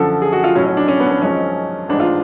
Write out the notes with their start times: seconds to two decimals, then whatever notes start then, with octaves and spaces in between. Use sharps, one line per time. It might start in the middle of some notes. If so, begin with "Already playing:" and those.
Already playing: F#2 D3 F3 A4
0.22 G#4
0.32 F#4
0.44 F4
0.55 B1 A2 F#3 C#4
0.66 C#4
0.77 D4
0.88 C#4
1.00 B3
1.07 C#4
1.10 B3
1.22 G#1 F#2 F3 G#3 C#4
1.89 A1 G#2 G#3 D4
2.00 F4